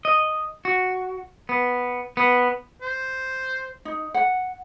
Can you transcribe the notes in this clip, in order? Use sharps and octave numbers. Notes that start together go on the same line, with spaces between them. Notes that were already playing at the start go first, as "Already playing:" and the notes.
D#5
F#4
B3
B3
C5
D#4
F#5